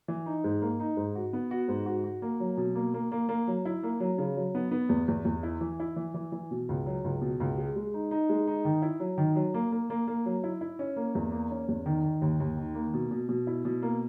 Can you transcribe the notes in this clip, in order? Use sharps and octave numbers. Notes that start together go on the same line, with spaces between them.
E3
D#4
G#2
A#3
D#4
G#2
F#4
B3
F#4
G#2
F#4
F#4
A#3
F#3
B2
A#3
A#3
A#3
A#3
F#3
E4
A#3
F#3
C#3
F#3
B3
B3
E2
E2
E2
E4
E3
E4
E3
E3
E3
B2
C#2
F#3
C#2
B2
C#2
G#3
G#3
D#4
D#4
G#3
D#4
D#3
E4
F#3
D#3
F#3
A#3
A#3
A#3
A#3
F#3
E4
E4
C#4
A#3
E2
A#3
C#4
E2
D#3
D#3
D#2
D#2
D#3
A#3
B2
B2
B2
E4
B2
A#3